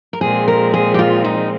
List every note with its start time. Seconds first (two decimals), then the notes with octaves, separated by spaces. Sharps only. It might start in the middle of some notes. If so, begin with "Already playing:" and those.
0.13 A#4
0.21 A#2 F3 G#3 C4 G#4
0.48 A#4
0.74 G#4
0.94 G4
0.99 F4
1.24 D#4